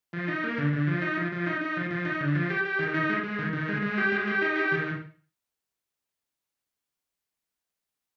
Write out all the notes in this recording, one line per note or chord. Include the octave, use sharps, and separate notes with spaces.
F3
D#4
A#3
D3
D3
F3
D#4
F3
F3
D#4
D#4
F3
F3
D#4
D3
F3
G4
G4
D#3
D#4
G#3
G#3
D#3
D#3
G#3
G#3
G4
G#3
G4
D#4
G4
D#3